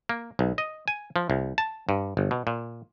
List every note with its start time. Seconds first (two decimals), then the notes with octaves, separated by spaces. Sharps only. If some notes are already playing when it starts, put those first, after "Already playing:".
0.09 A#3
0.39 B1
0.58 D#5
0.88 G#5
1.16 F3
1.30 C2
1.58 A5
1.89 G2
2.17 G1
2.31 B2
2.47 A#2